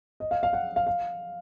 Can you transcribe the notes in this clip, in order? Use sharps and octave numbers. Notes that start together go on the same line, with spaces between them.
D#5
F5
F5
F#5
F5
F5